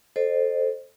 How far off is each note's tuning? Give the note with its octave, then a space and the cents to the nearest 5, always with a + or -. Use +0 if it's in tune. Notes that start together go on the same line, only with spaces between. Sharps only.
A4 +0 C5 +0 D#5 -40